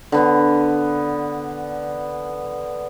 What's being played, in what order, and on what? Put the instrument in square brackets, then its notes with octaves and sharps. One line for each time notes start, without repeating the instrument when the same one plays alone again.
[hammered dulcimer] D3 B3